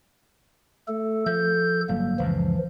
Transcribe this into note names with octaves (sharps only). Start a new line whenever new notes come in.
A3 A4
F3 A4 G6
G1 F#3 G3 A#3
C#2 F#2 A2 E3 F3